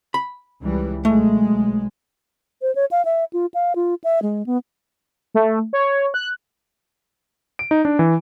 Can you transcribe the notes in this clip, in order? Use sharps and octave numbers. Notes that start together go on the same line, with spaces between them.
B5
C#2 E3 G3
B1 G#3 A3
C5
C#5
F5
E5
F4
F5
F4
E5
G#3
B3
A3
C#5
F#6
D7
D#4
D4
E3